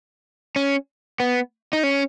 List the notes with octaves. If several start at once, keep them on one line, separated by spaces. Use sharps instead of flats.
C#4
B3
D#4
C#4